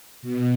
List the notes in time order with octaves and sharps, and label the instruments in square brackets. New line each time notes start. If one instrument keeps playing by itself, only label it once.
[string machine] B2